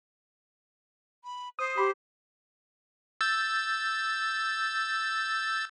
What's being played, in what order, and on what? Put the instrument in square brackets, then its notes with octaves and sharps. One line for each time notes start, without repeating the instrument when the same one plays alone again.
[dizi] B5
[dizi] C5 [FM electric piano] D#6
[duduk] G4 [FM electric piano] B5 C6
[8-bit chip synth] E6 G6 A6